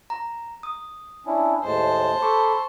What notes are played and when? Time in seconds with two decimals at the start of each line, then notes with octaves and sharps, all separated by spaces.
0.10 A#5
0.63 D#6
1.27 C#4 D4 E4
1.64 D#2 A2 G#3 C5 A5
2.22 A4 B5 C#6 D6